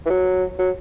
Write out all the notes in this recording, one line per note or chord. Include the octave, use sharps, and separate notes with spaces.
E3
F#3
F#3